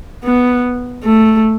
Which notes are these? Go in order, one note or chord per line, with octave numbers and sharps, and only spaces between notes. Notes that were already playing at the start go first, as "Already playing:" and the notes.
B3
A3